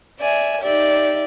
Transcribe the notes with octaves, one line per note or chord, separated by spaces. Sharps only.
D5 E5 G#5
D#4 G4 D5 E5